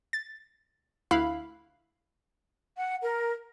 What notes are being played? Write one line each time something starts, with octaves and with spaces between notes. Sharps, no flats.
A6
D2 E4 F5 B5 F#6
F#5
A#4